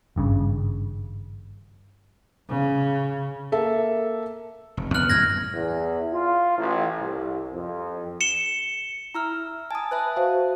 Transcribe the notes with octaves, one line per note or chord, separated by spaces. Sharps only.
G#1 G2 C#3
C#3
A#3 A4 E5
F1
D#2 D3 B3 F6 F#6 F#7
F#2 A2 D3 F6 G#6 A#6
E2
F4
A1
C2
F2
C#7 E7 G7
E4 A#5 E6 F6
G#5 A5 D#6
B4 E5 A5 F#6
F#4 C5 F5